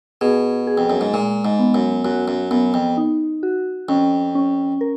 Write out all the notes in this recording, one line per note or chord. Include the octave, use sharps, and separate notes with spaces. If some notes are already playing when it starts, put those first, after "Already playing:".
B2 G#4
G#4
F2
F#2
G#2
A#2 G#3
G#2
B3
F#2
F#2 F#4
F#2
F#2 B3
F2
D#4
F#4
F2 C#4
C#4
A#4